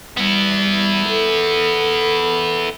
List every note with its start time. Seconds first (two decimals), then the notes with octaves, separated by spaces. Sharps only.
0.17 G3 B3 E4
1.08 A4